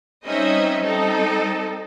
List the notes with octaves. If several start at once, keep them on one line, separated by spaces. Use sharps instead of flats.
G3 C4 C#4 D#4 D#5 E5
G3 C4 D#4 A4